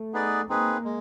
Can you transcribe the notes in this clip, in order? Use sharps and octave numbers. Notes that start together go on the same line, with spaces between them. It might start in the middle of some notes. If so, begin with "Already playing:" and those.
Already playing: A3
B3 D#4 G#4 B4 D5
A#3 C4 D#4 G#4 B4
G#3